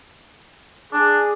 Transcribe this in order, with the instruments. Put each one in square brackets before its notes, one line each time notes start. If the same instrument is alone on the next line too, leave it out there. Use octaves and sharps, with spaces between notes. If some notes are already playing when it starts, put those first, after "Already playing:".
[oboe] D4 [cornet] G#4